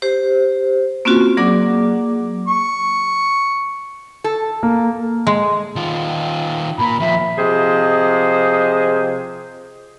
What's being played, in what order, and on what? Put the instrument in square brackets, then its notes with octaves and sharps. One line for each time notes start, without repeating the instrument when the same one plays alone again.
[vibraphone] G4 C5
A#3 C4 C#4 F4 F#4
F#3 A#3 G#4 D5 F#5 D6
[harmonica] C#6
[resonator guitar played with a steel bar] A4
[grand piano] A#3
[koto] G#3
[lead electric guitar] D#3 F4
[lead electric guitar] A#2 A#3 [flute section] A#5 B5
[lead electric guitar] D#2 F3 [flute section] E5
[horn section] C3 F3 G#4 C5 D#5